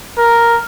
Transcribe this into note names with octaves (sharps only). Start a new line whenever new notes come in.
A#4